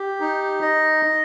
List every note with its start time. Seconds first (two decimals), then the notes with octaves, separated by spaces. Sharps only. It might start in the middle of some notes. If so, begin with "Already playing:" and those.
Already playing: G4
0.20 D#4
0.62 D#5